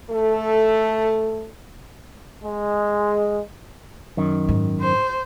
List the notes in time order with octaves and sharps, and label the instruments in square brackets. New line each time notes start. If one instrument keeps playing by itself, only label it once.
[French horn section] A3 A4
[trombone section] G#3
[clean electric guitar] F#2 D#3
[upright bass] G#2
[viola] C5